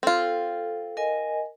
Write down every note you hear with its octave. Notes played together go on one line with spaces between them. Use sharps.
C4 F4 A4
A#4 D#5 G#5